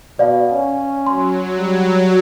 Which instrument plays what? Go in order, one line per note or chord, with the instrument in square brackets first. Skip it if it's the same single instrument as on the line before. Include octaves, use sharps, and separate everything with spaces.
[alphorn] B2 [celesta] D5 F5
[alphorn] C#4
[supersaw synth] F#3 [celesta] C6
[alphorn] G3